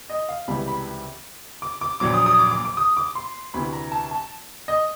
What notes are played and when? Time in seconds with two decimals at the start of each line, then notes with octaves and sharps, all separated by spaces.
0.10 D#5
0.29 F5
0.48 C#2 C3 E3 G3 B5
0.68 B5
1.62 D6
1.81 D6
2.00 A#1 A#2 F#3 D6
2.14 D#6
2.26 D#6
2.39 D6
2.51 D6
2.65 D6
2.77 D#6
2.97 D6
3.15 C6
3.54 D2 C3 E3 B5
3.73 A#5
3.92 A5
4.11 A5
4.68 D#5